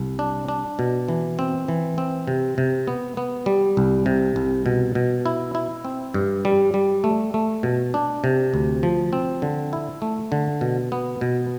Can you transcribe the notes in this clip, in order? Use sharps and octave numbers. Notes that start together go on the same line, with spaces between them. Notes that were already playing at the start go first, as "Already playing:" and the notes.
Already playing: C2
D4
D4
B2
E3
C4
E3
C4
C3
C3
B3
B3
G3
C2
C3
C2
B2
B2
E4
E4
C4
G2
G3
G3
A3
A3
B2
D4
C3
D2
F3
C4
D3
E4
A3
D3
B2
B3
B2